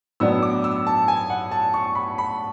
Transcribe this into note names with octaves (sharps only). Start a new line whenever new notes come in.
A2 F#3 B3 D4 E6
D6
E6
A5
G#5
F#5
A5
C#6
B5
B5